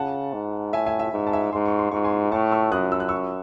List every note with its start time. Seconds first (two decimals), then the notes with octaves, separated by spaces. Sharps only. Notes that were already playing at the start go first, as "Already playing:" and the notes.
Already playing: C#3 F#5 A5
0.33 G#2
0.73 A2 E5 G#5
0.86 E5 G#5
0.99 E5 G#5
1.13 G#2
1.27 A5
1.33 E5 G#5
1.53 G#2 C6
1.65 C#6
1.79 C6
1.91 G#2 C#6
2.04 G#5 C6
2.32 A2 A5 C#6
2.52 C#6 E6
2.72 F#2 D#6 F#6
2.92 E6
3.00 F#6
3.09 C#6 E6